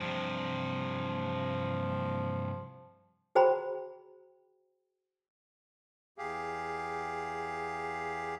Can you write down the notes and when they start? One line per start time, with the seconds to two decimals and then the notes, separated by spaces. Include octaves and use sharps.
0.01 G2 C3 F3
3.35 F#4 G#4 C5 G5 A#5 B5
6.18 E2 G4 G#4 F5